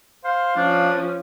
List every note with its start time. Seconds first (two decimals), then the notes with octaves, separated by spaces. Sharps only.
0.25 C5 F5
0.56 F3 C#4 D4